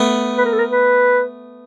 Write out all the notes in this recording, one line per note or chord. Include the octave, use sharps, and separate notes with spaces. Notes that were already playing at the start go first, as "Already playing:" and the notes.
Already playing: A3 B3
B4
A#4
A4
A#4
B4